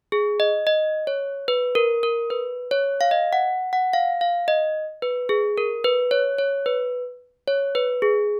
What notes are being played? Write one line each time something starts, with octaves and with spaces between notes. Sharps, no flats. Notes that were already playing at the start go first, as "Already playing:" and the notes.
G#4
D#5
D#5
C#5
B4
A#4
A#4
B4
C#5
F5
D#5
F#5
F#5
F5
F5
D#5
B4
G#4
A#4
B4
C#5
C#5
B4
C#5
B4
G#4